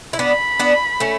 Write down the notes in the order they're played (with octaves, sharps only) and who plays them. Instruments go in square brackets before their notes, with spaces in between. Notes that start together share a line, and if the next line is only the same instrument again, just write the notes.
[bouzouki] E4
[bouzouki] B3 D4 [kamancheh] B5
[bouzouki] B3 D4
A3 C#4